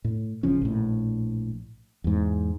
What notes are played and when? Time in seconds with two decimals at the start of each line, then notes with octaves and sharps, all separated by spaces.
0.04 A2
0.43 F#1 C#3 F3 C#4
0.61 A#1 A2
2.04 E2 G#2